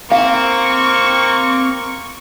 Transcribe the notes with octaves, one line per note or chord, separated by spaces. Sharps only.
A#3 C4 F5 C#6